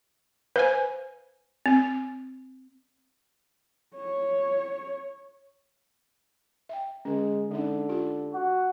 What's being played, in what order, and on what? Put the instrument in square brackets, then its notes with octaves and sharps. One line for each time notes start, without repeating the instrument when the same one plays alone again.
[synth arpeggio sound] B4 F5 G#5 [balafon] C5
[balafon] C4
[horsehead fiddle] C#5
[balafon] E5 G5
[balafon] D3 C#4 [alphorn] G#3
[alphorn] D3 [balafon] G#3 C#4 D#4
[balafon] F4 G4
[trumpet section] F#4